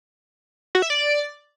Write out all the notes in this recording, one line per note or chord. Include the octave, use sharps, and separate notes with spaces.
F#4
E5
D5